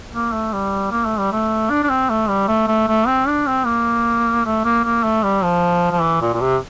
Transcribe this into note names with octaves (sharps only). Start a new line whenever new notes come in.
A#3
A3
G3
A#3
A3
G3
A3
D4
D4
C4
A3
G3
A3
A3
A3
C4
D4
C4
A#3
A3
A#3
A#3
A3
G3
F3
F3
E3
A#2
A#2
C3